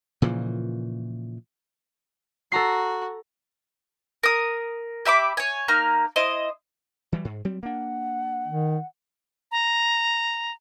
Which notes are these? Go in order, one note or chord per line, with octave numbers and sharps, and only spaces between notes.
A#2 C#3 E3 F3
F#4 A4 A#5 C7
A#4 D#6
G4 E5 B5 D6
C#5 G#5
A#3 D#4 A#5 F6
E4 C5 D#5
E3 F#3 G3
G#2
F#3 G3 C4
A#3 D4 F#5
D#3
A#5